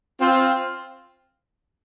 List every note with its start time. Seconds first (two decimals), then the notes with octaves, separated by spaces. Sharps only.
0.20 C4 F4